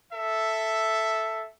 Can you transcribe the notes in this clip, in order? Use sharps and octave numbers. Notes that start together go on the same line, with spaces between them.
A4 E5